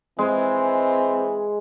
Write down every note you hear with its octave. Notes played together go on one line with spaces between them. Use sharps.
E3 G#3 C4